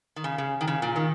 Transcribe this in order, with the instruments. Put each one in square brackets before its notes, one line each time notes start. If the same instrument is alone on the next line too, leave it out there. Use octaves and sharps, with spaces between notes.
[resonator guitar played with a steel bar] D#3
C#3
C#3
D#3
C#3
A#2
D#3